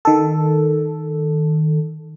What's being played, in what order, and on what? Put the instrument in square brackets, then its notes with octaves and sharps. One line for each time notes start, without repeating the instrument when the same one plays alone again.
[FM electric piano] D#3 A4